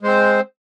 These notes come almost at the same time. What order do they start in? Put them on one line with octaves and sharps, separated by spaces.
G#3 C5 C4